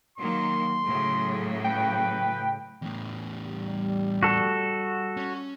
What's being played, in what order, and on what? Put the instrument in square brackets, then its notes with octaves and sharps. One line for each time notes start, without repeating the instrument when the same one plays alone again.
[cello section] D#3 F#3 A#3 [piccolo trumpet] C6
[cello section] A2 C#3 F#3
[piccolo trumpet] B4 [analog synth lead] G5
[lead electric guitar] E2 A2
[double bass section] G3
[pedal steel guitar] F#4 A4
[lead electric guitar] C#4